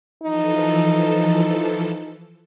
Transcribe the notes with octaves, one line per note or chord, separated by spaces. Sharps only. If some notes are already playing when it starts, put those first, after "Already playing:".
E3 F3 D#4 A4